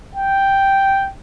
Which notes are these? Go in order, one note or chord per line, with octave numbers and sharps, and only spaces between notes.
G5